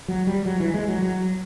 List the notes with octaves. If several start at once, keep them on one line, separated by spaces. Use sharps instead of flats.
F#3
G3
F#3
E3
G#3
F#3
F#3